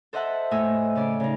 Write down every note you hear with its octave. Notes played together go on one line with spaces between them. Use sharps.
A4 C5 D#5 E5 F#5 A5
A2 D#5 G#5 E6
C#3 C#4 D5
C#3 D#4